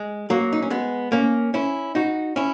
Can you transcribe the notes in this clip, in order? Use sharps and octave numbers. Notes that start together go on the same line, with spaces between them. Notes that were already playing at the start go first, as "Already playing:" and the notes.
Already playing: G#3
F#3 A#3
D#4
C#4
G#3 B3
A#3 C#4
C#4 E4
D#4 F#4
C#4 E4